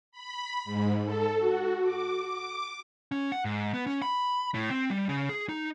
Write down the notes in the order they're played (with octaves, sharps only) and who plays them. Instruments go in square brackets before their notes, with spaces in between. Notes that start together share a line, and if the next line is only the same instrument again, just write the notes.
[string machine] B5
G#2
A4
F#4
D6
D6
[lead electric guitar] C#4
F#5
G#2
B3
C#4
B5
A2
C4
G3
C#3
G#4
D#4